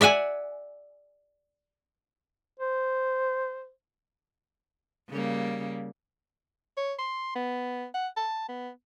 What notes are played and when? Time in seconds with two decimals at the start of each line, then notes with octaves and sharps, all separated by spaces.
0.01 D5 E5 F#5 G#5
2.59 C5
5.09 C#3 G3 A#3
6.77 C#5
6.99 C6
7.36 B3
7.94 F#5
8.16 A5
8.49 B3